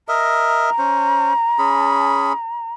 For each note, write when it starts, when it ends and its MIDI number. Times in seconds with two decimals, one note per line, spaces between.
0.08 0.70 70
0.08 0.70 75
0.08 0.70 76
0.08 2.74 82
0.78 1.33 61
0.78 1.33 72
1.58 2.33 61
1.58 2.33 68
1.58 2.33 83